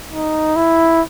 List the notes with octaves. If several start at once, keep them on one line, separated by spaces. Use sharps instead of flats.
D#4
E4